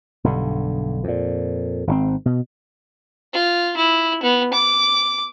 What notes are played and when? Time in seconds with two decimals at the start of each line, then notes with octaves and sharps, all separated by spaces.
0.24 B1 G2 D3
1.04 F2 A#2
1.87 G#1 C3 C4
2.25 B2
3.33 F4
3.77 E4
4.23 B3
4.54 D6